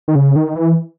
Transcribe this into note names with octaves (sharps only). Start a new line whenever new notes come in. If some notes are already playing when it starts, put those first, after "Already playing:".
D#3
C#3
D#3
E3